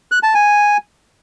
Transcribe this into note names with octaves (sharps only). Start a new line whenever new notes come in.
F#6
A5
G#5